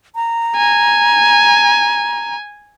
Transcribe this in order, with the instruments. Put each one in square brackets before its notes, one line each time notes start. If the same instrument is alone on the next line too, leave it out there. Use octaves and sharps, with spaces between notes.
[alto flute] A#5
[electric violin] G#5